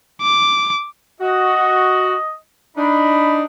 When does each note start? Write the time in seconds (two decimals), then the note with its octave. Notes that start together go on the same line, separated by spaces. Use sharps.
0.22 D6
1.21 F#4 D#5
2.77 D4 D#4 B5